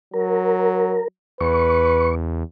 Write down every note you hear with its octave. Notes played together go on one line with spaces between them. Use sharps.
F#3 A#4
E2 B4 C#6